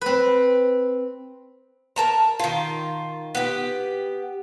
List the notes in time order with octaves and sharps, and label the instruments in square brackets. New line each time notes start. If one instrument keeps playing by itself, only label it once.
[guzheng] C4 B4
[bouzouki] A#4 A5 A#5
D#3 F4
B3 G4